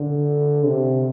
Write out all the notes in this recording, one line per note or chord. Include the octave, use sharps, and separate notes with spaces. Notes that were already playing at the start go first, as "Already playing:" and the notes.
Already playing: D3
C3